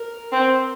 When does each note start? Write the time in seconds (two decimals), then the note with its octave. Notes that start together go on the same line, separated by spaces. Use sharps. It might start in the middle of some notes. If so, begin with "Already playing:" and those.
Already playing: A#4
0.32 C4